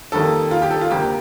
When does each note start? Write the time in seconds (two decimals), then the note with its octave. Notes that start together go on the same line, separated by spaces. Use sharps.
0.12 F2 D#3 G3 A#3 A4
0.51 F4
0.62 G4
0.71 A4
0.81 F4
0.90 D2 C3 G3 A#3 G4